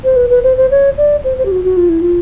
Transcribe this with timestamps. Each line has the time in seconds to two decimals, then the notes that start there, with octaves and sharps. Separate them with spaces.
0.04 C5
0.16 B4
0.30 B4
0.43 C5
0.57 C5
0.71 C#5
0.98 D5
1.24 C5
1.38 C5
1.46 G4
1.51 F#4
1.64 F#4
1.77 F4
1.89 E4
2.01 F4